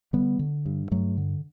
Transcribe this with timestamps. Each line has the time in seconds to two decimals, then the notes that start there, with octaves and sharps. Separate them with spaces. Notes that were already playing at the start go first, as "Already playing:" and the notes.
0.13 D3 G3 B3
0.39 D3
0.66 G2
0.91 G2 F#3 A3
1.17 D3